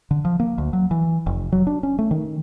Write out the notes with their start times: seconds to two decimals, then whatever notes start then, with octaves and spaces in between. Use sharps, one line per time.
0.11 D3
0.25 F3
0.40 A#3
0.58 D2
0.73 F#3
0.91 E3
1.26 F1
1.52 F#3
1.67 D4
1.83 C#4
1.99 A3
2.11 D#3